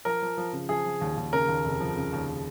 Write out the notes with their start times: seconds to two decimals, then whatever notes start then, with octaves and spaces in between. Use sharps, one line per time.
0.05 F3 A#4
0.22 F3
0.37 F3
0.53 C#3
0.69 F3 G#4
0.85 F3
1.01 D#2
1.17 D#2
1.33 C#3 A#4
1.49 D#2
1.65 F1
1.80 F3
1.96 C#3
2.13 D#2